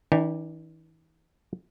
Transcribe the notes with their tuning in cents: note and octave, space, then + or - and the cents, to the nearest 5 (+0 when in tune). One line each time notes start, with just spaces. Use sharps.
E3 -40 D4 +0 G5 -20